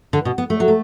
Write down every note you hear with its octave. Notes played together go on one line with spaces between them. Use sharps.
D3
B2
B3
A3
F#3
A3